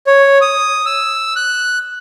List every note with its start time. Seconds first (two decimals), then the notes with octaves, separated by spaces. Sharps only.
0.07 C#5
0.41 D#6
0.86 E6
1.36 F#6